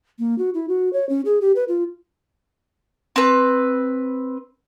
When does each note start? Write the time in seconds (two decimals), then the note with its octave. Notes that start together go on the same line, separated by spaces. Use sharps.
0.19 A#3
0.38 F#4
0.54 E4
0.68 F#4
0.93 C#5
1.09 C#4
1.25 G#4
1.41 G4
1.56 B4
1.68 F4
3.16 C4 B4